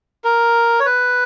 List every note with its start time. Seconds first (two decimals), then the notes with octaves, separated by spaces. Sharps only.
0.24 A#4
0.80 C#5
0.86 B4